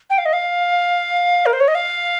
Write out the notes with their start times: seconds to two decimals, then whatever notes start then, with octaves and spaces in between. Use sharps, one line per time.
0.10 G5
0.18 F5
0.25 D#5
0.33 F5
1.46 A#4
1.53 C5
1.60 C#5
1.68 D#5
1.75 F5